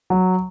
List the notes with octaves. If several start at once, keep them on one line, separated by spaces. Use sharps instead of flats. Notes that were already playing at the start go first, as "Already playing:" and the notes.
F#3